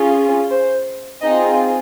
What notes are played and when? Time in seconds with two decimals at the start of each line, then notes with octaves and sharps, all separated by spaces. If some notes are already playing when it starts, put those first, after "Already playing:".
Already playing: C#4 F4 G#4
0.50 C5
1.21 C4 D#4 F4 G#4 D#5